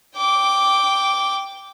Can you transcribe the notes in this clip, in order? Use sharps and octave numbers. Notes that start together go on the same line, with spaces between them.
G5 D6